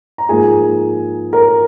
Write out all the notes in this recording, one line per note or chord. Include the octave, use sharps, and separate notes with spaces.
A#5
G#2 F3 A#3 G#4 G#5
A#4 A#5